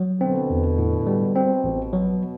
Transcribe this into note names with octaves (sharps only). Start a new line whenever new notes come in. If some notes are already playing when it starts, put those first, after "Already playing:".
Already playing: F#3
B2 D3 C4
E2
A2
G3
B2 C4
A1
F#3